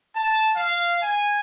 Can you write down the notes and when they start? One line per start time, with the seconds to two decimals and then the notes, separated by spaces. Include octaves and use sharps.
0.16 A5
0.55 F5
1.01 G#5